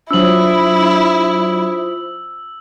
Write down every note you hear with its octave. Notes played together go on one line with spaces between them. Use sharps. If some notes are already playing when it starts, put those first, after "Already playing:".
F#3 D4 E4 F4 C5 D#6 E6 F#7